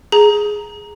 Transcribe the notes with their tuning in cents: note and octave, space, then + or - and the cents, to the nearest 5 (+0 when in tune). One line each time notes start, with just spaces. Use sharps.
G#4 +0 A#5 +0